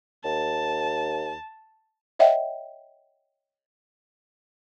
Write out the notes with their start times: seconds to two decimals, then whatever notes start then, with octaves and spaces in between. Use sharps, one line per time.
0.25 D#2 A5
2.19 C#5 D#5 E5 F#5 G5